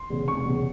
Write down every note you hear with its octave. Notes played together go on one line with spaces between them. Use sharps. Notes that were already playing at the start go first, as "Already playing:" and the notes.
Already playing: C6
E2 C#3
F1 C#6
E2 C#3